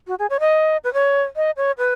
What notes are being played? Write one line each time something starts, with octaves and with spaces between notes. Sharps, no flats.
F#4
G#4
C#5
D#5
B4
C#5
D#5
C#5
B4